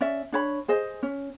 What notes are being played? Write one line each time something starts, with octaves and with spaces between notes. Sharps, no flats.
C#4 D5 E5
D4 C#5 B5
G#4 C5 D#5
C#4